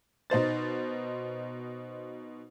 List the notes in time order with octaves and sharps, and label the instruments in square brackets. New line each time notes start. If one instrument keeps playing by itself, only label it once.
[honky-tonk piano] B2 D#4 C5 A6